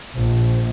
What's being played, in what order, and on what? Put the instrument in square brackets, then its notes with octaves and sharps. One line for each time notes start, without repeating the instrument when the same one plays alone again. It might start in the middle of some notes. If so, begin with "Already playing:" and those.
[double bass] A#1